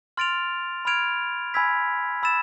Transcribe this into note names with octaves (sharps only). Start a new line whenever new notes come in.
C6 F6 A6 D7 F7
B5 F6 G#6 D7 F7
G#5 B5 E6 G#6 B6
B5 E6 A6 E7